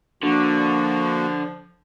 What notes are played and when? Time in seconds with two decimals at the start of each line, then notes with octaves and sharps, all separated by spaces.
0.23 D3 F3 A#3 F#4